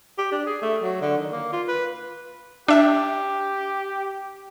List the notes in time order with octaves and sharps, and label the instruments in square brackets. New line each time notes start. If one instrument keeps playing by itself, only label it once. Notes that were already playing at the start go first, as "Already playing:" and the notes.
[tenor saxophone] G4
D4
G#4
A3
F#3
D3
D#3
A#3
F4
B4
[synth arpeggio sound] D4 E5 B6 [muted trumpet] G4